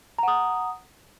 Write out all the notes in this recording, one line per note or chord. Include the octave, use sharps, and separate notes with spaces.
F#5 A#5 D#6